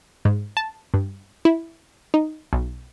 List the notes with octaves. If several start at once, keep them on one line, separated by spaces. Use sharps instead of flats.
G#2
A5
G2
E4
D#4
B1